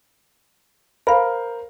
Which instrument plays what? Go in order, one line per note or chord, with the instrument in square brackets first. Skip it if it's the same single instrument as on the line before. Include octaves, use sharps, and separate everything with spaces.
[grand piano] A#4 C5 [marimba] F5 B5